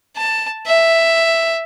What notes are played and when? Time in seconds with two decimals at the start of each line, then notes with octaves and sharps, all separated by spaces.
0.17 A5
0.67 E5